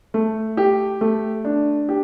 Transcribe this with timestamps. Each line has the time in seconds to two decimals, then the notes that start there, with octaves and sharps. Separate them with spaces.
0.14 A3
0.57 G4
1.01 A3
1.45 D4
1.89 G4